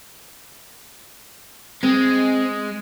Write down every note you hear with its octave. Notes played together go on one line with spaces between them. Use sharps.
G#3 C4